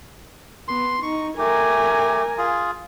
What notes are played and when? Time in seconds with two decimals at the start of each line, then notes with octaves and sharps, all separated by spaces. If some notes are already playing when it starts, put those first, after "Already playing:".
0.68 B3 C6
1.03 D#4 C#6
1.38 A3 G4 A#4 G#5
2.38 F4 G#4